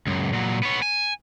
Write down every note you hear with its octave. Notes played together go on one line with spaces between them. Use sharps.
C#2 F#2
A#2 F#3
B3 C#5
G#5